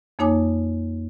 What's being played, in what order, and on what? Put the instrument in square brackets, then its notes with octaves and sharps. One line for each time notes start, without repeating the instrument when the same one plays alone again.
[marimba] F2 A#3 D#4 C#5 G#5 D6